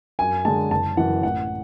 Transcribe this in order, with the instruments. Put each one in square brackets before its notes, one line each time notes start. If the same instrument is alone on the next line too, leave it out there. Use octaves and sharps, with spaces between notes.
[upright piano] F#2 G#5
D3 G#3 A5
F#1 A5
F#2 E3 F#5
A1 F#5